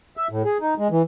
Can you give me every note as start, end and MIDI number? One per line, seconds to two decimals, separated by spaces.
0.17 0.28 76
0.30 0.43 45
0.45 0.58 68
0.61 0.74 63
0.78 0.88 56
0.91 1.02 52